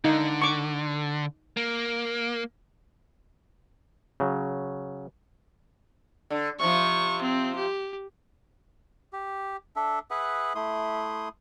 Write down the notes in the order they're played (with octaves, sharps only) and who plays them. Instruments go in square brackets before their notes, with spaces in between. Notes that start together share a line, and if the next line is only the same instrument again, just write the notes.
[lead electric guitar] D3 [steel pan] D#4
[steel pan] C#6 D6
[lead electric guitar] A#3
[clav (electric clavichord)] C#3 F#3
[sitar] D3
[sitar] C3 F3 [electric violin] C#6
[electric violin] C4
G4
[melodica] G4
D4 A4 E5
G#4 B4 E5 F#5
A3 E4 C6 D#6